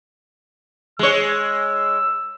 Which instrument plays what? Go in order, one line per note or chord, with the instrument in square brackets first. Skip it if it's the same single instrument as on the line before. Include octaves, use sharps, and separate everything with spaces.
[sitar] G#3 C#5 [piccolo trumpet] E6